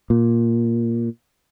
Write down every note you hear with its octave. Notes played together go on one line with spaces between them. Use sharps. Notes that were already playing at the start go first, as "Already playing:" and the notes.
A#2